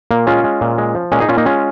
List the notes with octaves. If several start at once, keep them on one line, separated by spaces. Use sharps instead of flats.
A#2 A#3
G#3 C#4 F4
G#3
A#2
G#3
F3
A#2 G#3 C#4
D#4 G#4
A#2 C#4 F4
A#3 D#4
G#3 C#4 F4